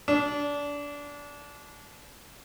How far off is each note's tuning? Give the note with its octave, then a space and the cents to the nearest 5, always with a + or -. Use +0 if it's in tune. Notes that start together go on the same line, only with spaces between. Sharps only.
D4 -25